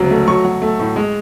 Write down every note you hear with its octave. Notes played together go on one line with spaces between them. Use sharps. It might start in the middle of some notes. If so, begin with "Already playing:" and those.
Already playing: D2 G#2 C#3 F#3
A3
F#3 C#6
F#3
A3
A2
G#3